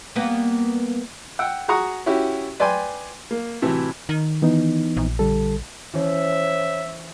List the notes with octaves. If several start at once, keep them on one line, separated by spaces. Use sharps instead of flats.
G3 A#3 B3
F#5 G5 E6
F#4 G#4 F#5 A#5 C#6 D#6
C#4 E4 F#4 G4
B4 D5 G5 G#5 C6
A#3
A2 C3 E3 F#3
D#3
E3 B3 D#4
A#1
D3 G3 A4
E3 F3 C#4 C#5 E5